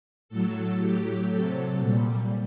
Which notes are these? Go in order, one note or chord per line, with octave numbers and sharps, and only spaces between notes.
A2 F#3 A4
A2 F#3 G4
C3 F#3 A4
A#2 G3